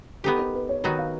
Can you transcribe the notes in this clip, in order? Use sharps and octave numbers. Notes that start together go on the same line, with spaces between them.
B3 D#4 G4 A4
A#4
B4
C#5
D#3 F#3 B3 D#4 F#4
F5